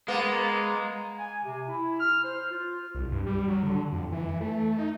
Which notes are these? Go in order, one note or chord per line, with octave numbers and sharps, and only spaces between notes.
G#3 A#3 B3
G#5
C3
E4
F6
C5
F4
C2
G2
G3
F#3
D3
F2
E3
A3
D#4